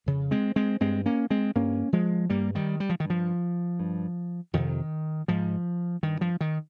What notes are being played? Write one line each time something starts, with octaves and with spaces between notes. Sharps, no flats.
F2 C#3
G#3 C4
G#3 C4
G2 G#3 C4
A#3 C#4
G#3 C4
G2 A#3 C#4
F3 G#3
G2 G3 A#3
D#3 G3
G3
F3
D#3
G2
F3
G2
F2 C3 D#3
G#2 F3
G2 D#3
F3
D#3